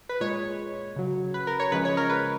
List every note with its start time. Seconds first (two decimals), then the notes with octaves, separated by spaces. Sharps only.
0.09 B4
0.20 A#2 G#3 C#5
0.96 C#3 F#3
1.34 B4
1.47 A#4
1.60 C#5
1.72 C#3 F3 G#3 B4
1.85 C#5
1.97 A#4
2.10 B4